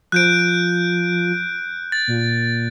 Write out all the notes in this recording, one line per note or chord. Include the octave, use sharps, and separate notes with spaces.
F3 F#6 G6 D7
A6
A#2